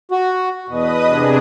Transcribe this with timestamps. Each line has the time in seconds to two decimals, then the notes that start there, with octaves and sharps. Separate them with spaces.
0.11 F#4
0.69 E2 B2 B4 D#5 D#6
1.06 C3 D4 G#4